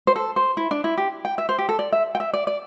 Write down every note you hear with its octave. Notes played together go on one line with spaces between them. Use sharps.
C5
A4
C5
E4
D4
E4
G4
G5
E5
C5
G4
A4
D5
E5
G5
E5
D5
D5